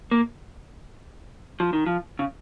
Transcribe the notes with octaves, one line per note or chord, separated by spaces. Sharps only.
A#3
F3
D#3
F3
C#3